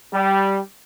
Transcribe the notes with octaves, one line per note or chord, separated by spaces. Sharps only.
G3